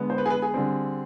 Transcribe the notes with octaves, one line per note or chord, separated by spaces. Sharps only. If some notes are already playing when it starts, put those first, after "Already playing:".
Already playing: D3 G#3 B3
C5
B4
G#4
B4
G#4
D3 G3 C4